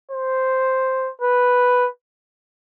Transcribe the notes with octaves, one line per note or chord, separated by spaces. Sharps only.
C5
B4